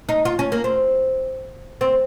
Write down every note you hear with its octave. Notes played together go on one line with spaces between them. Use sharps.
D#4
F4
C#4
A#3
C4
C4